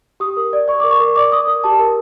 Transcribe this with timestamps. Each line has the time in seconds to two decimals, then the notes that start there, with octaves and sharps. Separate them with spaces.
0.20 G4 D#6
0.37 A#4
0.53 D5
0.68 D5 C#6
0.80 A#4 D6
0.91 C#6
1.00 A#4
1.16 D5 D6
1.32 D5 D#6
1.47 A#4
1.64 G4 A5
1.79 A#4